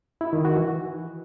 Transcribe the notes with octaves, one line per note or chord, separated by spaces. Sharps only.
E4
D#3
F#4
E3